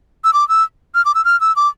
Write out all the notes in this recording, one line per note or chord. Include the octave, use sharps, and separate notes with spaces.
E6
D6
E6
F6
D6
E6
F6
E6
D6